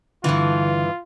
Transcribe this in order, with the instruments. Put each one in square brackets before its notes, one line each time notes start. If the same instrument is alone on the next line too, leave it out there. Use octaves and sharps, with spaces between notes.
[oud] G2 E3 [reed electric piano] D3 [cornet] F4